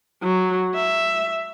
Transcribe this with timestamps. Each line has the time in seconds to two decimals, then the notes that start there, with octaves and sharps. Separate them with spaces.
0.23 F#3
0.75 E5